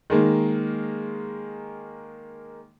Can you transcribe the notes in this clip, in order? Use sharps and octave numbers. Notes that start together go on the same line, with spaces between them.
D#3 G#3 A#3